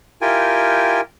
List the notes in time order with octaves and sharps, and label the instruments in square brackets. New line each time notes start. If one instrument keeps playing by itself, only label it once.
[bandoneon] E4 F4 G4 A#4 G5 G#5